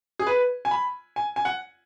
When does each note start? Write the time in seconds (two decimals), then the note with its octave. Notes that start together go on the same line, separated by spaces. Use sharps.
0.19 G#4
0.27 B4
0.65 G#5
0.71 B5
1.16 G#5
1.36 G#5
1.45 F#5